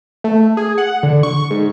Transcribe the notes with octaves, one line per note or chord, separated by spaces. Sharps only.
A3
G#4
F#5
D3
C#6
G#2